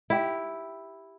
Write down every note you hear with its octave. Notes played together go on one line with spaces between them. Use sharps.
E4 G4